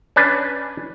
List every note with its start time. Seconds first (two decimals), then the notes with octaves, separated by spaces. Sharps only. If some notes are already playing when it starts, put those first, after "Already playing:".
0.16 C#4 D4 B4